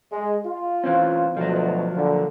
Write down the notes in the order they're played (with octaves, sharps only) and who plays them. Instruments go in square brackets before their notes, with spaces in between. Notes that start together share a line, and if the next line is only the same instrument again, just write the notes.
[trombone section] G#3
F4
[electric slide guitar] E3 C4 C#4
[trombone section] D2 B2 [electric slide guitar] F3 F#3
[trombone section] A#2 D3